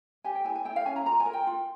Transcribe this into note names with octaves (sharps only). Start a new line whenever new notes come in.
G4 G#5
G5
E4 G#5
G#5
E4 G5
F5
C#4 G#5
A#5
F4 A#5
G#5
A#4
G5
F4